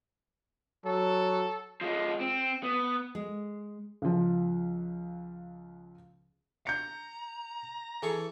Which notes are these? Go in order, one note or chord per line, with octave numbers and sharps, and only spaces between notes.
F#3 A4
F3 G#3
C4
B3
G#3
C#2 F3
A#5 G6 C#7
E3 G#4 A4 C#6